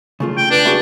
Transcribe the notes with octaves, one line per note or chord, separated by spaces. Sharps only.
C#3 A3 F4
G5
D4 B4
E4 F#4 G#4